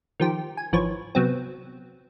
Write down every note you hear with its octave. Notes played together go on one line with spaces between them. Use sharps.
D#3 F3 G4
G#5
G#1 E3 F3 C#5
C3 F#3 B3 C4